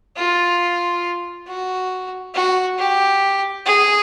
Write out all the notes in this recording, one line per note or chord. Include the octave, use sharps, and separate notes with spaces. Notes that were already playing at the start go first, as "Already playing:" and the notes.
F4
F#4
F#4
G4
G#4